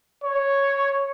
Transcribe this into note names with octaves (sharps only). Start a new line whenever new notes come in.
C#5